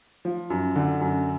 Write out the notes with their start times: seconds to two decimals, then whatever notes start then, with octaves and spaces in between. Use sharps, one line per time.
0.25 F3
0.50 F#2
0.76 D3
1.01 F#2